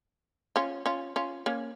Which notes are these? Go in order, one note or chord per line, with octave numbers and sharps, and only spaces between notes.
C#4 F4
C#4 F4
C#4 F4
A#3 C#4